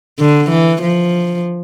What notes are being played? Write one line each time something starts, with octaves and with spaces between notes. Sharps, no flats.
D3
E3
F3